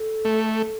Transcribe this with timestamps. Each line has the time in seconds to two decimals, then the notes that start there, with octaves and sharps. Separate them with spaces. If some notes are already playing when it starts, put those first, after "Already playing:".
Already playing: A4
0.25 A3